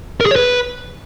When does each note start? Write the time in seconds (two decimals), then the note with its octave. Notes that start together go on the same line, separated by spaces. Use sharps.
0.21 A#4
0.26 G#4
0.31 C#5
0.36 B4